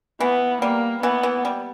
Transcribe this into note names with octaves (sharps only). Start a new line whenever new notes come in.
E3 B3
G3 A#3
E3 B3
E3
G3